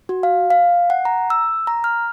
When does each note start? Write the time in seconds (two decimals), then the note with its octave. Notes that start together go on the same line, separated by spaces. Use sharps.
0.09 F#4
0.23 F5
0.50 F5
0.90 F#5
1.05 A#5
1.30 E6
1.67 A#5
1.84 F6